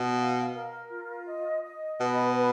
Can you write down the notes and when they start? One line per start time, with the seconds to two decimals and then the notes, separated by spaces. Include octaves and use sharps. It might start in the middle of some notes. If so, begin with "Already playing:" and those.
Already playing: B2
0.15 F5
0.52 A#4
0.90 F4
1.26 D#5
1.63 D#5
2.00 B2 B4
2.37 B4